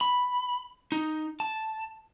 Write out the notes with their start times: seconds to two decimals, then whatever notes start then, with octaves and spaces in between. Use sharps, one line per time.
0.01 B5
0.92 D#4
1.40 A5